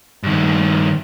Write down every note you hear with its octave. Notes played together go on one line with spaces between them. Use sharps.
G2 D#3